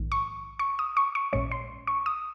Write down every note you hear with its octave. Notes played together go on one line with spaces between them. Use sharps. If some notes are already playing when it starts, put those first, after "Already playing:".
Already playing: A#1 G#2 D#3
C#6
C#6
D#6
C#6
C#6
A#1 A#2 G#3 C#4 C#6
C6
C#6
D#6